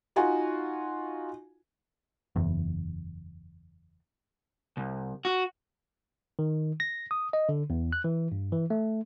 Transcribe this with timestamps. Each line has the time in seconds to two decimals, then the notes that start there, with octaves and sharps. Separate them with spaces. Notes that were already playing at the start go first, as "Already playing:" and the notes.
0.16 D#4 F4 F#4 G#5
2.36 F#1 E2
4.77 C2
5.25 F#4
6.39 D#3
6.80 A#6
7.11 D#6
7.33 D#5
7.49 D3
7.70 E2
7.93 F#6
8.04 E3
8.32 G2
8.52 E3
8.70 A3